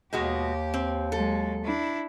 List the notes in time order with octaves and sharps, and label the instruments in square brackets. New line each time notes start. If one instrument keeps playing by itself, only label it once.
[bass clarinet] D#2 [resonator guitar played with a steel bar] B2 G#3 F#4 [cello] G4
[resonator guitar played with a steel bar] C4
[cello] F#3 G#3 [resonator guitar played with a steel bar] A4
[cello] D4 E4